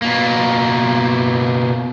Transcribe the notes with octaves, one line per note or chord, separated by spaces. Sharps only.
B2 A#3